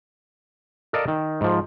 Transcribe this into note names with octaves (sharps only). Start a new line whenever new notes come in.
A4 A#4 D5 D#5 F5
D#3
G#2 F3